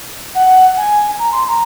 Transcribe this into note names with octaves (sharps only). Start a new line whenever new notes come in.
F#5
G#5
A#5
C6
C6
A#5